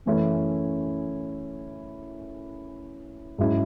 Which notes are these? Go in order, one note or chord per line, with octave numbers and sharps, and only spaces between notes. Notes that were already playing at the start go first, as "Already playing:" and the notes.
F#2 E3 A3 C#4 E4
G#2 F#3 C#4 E4